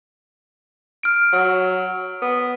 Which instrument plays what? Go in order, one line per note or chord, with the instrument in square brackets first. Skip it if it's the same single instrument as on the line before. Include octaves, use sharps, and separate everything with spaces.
[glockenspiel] F6 D7
[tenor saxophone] F#3
B3